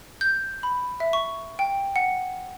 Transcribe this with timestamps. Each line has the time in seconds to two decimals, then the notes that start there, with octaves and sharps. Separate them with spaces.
0.21 G6
0.63 B5
1.00 E5
1.13 C#6
1.59 G5
1.96 F#5